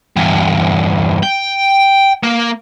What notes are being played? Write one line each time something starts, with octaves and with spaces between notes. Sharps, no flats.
E2 G2
G5
A#3